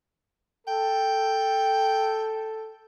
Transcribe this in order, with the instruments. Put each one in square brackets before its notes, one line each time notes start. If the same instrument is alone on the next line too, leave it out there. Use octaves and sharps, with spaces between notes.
[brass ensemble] A4 [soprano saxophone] G5